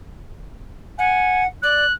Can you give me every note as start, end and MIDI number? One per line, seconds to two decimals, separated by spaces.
0.98 1.46 78
0.98 1.43 80
1.62 1.84 74
1.62 1.93 90